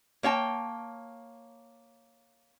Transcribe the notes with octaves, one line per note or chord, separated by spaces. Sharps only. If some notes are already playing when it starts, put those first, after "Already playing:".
A#3 C#5 G5 A5